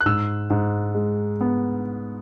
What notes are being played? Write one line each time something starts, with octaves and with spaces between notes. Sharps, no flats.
F#6
G#2 E6
G#2
G#3
B3